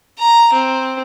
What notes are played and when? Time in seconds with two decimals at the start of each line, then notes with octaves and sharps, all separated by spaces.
0.19 A#5
0.53 C4